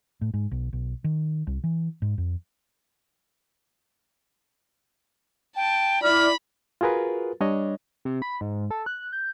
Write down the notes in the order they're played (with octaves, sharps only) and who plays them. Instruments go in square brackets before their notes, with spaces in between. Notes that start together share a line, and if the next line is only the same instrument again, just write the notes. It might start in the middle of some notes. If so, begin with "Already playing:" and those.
[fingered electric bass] A2
G#2
B1
B1
D#3
C2
E3
G#2
F2
[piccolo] G5 [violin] A5
[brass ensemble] E4 D5 [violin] B5 [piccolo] F6
[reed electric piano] F4 F#4 G#4 A#4 B4
G3 D4 C#5 D#5
[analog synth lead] C3
B5
G#2
A4
F#6
G6